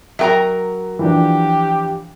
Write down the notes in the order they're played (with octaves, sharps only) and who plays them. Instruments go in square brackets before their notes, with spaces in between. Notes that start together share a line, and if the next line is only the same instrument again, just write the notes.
[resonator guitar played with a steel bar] F#3 A#4 A#5 [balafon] E5 G5
[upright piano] E3 F3 D4 [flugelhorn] G4